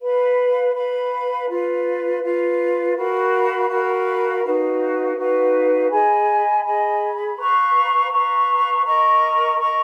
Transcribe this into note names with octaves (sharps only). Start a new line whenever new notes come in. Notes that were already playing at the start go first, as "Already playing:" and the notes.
B4 F5 B5
B4 F5 B5
F4 B4 F5
F4 B4 F5
F#4 A#4 F5 B5
F#4 A#4 F5 B5
D#4 F#4 B4 F5
D#4 F#4 B4 F5
G#4 D#5 G#5 B5
G#4 D#5 G#5 B5
B4 F5 A#5 C#6
B4 F5 A#5 C#6
A#4 D#5 A#5 C#6
A#4 D#5 A#5 C#6